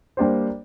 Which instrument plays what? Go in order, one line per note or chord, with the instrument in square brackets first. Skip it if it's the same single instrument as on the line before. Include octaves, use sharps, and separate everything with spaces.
[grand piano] G3 A#3 D4 G4 C5